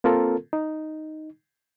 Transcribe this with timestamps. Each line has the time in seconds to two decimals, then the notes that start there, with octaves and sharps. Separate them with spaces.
0.04 A#3 C4 F4 A4 A#4
0.53 D#4